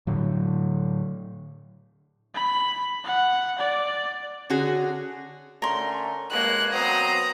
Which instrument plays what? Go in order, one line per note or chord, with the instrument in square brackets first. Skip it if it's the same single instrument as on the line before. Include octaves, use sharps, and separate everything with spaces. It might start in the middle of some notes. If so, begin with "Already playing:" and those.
[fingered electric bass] A2 D3 F#3
[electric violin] B5
F#5
D5
[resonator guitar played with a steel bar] D3 C#4 F#4 G#4
[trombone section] D3 A3 C#4 [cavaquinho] A#4 C6
[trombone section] A1 [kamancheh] G#3 A#3 [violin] F#6
[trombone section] F#3 B3 C4 [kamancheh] C5 [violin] A#5 D#6